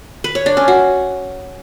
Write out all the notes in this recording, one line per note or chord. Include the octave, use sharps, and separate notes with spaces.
B4
C#5
D4
C#4
F#4